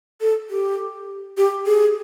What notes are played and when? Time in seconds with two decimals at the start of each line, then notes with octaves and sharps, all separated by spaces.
0.21 A4
0.50 G4
1.37 G4
1.67 G#4